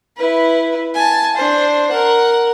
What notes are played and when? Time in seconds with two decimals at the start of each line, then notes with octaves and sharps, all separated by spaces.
0.17 E4 B4
0.94 G#5 A5
1.36 D4 C5
1.91 A#4 F#5